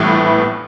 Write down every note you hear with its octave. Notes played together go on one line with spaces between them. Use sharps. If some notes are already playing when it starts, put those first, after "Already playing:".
Already playing: A#1 A2 E3 G3 B3